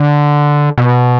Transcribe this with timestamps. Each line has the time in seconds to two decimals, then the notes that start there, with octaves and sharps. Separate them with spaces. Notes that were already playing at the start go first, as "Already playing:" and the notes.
Already playing: D3
0.78 B2